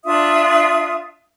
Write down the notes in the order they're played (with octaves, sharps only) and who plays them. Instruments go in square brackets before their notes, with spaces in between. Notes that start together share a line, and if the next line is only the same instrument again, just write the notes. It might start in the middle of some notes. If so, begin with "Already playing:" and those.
[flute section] D4 F4 E5 D#6